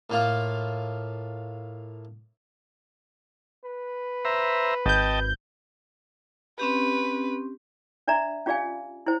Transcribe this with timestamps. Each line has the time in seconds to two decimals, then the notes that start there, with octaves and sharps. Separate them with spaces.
0.10 A2 A#3 F4
3.65 B4
4.25 C5 E5 A#5
4.86 G#1 D#5 G5 A5 G6
6.59 C4 C#4 G4 B4
8.08 D4 D5 E5 A#5
8.46 C#4 F4 G4 D5 F5 G#5
9.06 E4 C5